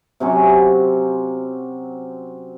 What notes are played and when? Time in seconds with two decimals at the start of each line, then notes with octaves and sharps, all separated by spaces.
0.20 C3 F#3 C4 C#4